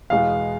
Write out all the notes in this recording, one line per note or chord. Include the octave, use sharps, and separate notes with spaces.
E2 B2 G#3 B3 F5